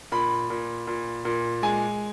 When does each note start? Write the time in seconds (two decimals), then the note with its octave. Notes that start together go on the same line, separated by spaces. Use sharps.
0.12 A#2 B5
0.50 A#2
0.87 A#2
1.25 A#2
1.63 G#3 G#5